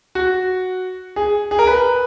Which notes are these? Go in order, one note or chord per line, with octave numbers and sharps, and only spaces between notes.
F#4
G#4
G#4
A#4
B4